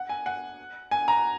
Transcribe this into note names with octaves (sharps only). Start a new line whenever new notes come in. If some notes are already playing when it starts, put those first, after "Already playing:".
Already playing: F#5
G#5
F#5
G#5
A#5